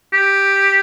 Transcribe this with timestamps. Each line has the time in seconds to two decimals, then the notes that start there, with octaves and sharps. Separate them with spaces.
0.13 G4